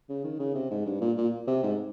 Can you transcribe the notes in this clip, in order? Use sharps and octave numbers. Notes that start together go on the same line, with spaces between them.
C#3
D#3
C#3
C3
G#2
G2
A#2
A#2
C3
G#2